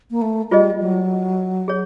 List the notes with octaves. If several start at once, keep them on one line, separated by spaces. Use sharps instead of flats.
A#3
A3
G3 F4 G#4 C5 D#5
F#3
G#4 C#5